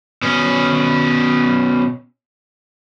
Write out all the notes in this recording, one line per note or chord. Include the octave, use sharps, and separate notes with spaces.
B2 C#4